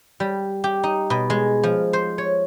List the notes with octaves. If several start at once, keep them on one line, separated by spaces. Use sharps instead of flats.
G3
G4
D#4
B2
G#3
F3
C5
C#5